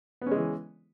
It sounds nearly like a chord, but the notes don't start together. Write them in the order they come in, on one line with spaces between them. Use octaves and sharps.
B3 C#4 G#3 E3